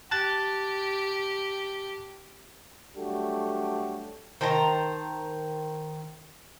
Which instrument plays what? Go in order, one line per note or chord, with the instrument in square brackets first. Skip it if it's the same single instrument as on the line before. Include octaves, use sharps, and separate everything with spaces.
[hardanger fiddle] G4 [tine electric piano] A5 F#6 A6
[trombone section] F#3 G3 A3 D4 F#4 G4
[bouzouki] D#3 C5 A5 A#5